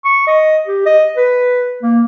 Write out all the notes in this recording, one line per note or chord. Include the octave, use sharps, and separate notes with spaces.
C#6
D#5
G4
D#5
B4
A#3